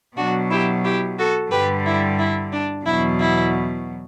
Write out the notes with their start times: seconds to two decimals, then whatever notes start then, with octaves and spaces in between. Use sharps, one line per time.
0.17 B2 F#3 D4 F#4
0.51 E4 G4
0.84 E4 G4
1.18 F#4 A4
1.51 G2 D3 G3 G4 B4
1.86 E4
2.19 E4
2.52 D4
2.86 E2 B2 F#3 E4
3.20 E4